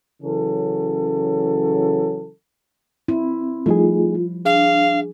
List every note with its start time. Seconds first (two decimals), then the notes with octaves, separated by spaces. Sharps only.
0.22 C#3 E3 F#3 C#4 A4
3.08 C4 E4
3.66 F3 G3 A3 D#4 F4 G#4
4.45 D4 G#4 F5